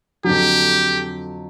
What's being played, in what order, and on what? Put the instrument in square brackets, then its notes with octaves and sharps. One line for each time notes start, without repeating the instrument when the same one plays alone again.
[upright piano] F2 D3 F#3 [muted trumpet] G4